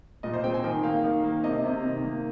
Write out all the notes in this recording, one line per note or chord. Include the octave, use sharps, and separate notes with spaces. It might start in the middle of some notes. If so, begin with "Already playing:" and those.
A#2 D#5
C5
C4 G5
G#5
D#3 G5
A#3 F5
D#3
A#3
C3 D#5
C3
D#3
A#3